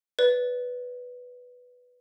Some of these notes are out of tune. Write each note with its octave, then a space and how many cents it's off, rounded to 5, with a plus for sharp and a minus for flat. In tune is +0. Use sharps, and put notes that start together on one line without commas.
B4 +0 D5 -25